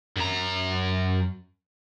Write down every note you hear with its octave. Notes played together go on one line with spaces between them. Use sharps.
F#2 A#5